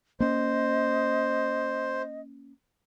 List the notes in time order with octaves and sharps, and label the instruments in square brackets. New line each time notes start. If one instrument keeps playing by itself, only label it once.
[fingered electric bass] A#3 C#4 [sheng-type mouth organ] C5 [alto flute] D#5